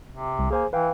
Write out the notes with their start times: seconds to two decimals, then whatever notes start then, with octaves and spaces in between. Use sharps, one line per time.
0.11 C3
0.39 C2
0.51 A#3 G#4 C5 G#5
0.73 E3 B4 F5 G5